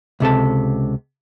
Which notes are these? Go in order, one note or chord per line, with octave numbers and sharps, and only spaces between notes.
C#2 C3 A4 A5